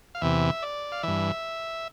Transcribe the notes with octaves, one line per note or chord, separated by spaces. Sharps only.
F5
E2 C3 E3 E5
D5
F5
G2 E3 E5